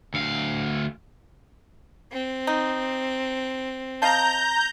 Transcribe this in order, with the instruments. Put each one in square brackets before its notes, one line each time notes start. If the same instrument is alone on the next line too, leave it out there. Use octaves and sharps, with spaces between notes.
[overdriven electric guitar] D2 F5
[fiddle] C4
[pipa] D#4
[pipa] D#5 F5 A5 [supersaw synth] A#5 G6